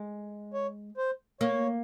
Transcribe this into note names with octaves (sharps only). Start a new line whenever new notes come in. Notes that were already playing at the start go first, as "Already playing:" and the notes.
Already playing: G#3
C#5
C5
A#3 C#5